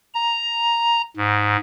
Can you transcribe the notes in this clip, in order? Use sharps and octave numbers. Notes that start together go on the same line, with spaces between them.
A#5
G#2